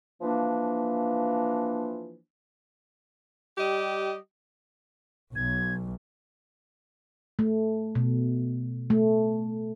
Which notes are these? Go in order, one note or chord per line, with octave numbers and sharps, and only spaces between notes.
E3 F3 A#3 D4
G3 G4 D#5
B1 G#6
A3
B2
A3